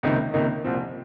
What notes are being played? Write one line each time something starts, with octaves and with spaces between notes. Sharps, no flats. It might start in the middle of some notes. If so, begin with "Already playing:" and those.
C#2 C3 D#3 A#3 D#4
C#2 C3 D#3 A#3 D#4
C2 A#2 F3 C4